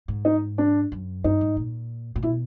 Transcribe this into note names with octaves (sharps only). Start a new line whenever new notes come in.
G#2
D#4
D4
F#2
G2 D#4
G#2
A#2
A#2
B2 E4